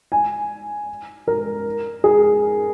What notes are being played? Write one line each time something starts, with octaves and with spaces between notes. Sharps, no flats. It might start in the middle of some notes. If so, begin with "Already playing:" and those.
G#5
A#4
G#4